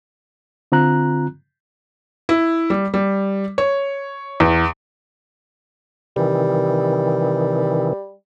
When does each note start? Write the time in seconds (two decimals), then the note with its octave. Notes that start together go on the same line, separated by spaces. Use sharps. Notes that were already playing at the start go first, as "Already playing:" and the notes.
0.72 D3 C4 F4 A#5 F#6
2.29 E4
2.70 G3
2.94 G3
3.58 C#5
4.40 E2
6.16 C3 D#3 E3 G3